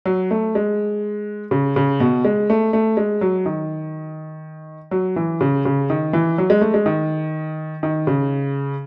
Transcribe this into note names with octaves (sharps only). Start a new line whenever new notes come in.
F#3
A3
G#3
C#3
C#3
B2
G#3
A3
A3
G#3
F#3
D#3
F#3
E3
C#3
C#3
D#3
E3
F#3
G#3
A3
G#3
D#3
D#3
C#3